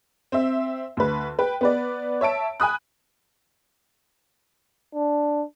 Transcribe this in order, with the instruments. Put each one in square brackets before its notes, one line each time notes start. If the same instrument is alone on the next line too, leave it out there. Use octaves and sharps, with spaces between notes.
[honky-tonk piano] C4 E5
D2 B4
B4 G5
B3 B4 D5
C#5 E5 A5 D7
G#5 B5 D#6 F#6
[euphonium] D4